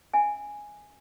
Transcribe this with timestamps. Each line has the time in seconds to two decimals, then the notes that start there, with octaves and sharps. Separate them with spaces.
0.14 C#4 E5 G#5